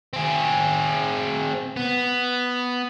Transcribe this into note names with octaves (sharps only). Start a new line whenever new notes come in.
C4 G#4
B3